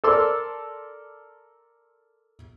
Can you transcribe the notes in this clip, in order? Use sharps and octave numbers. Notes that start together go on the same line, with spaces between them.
A4 A#4 D5 C6 D6 E6